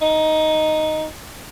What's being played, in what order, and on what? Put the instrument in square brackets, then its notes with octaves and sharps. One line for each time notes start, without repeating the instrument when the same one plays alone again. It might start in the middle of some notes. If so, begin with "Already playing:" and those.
[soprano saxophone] D#4